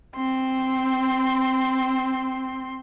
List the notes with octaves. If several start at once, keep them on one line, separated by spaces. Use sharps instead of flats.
C4 C6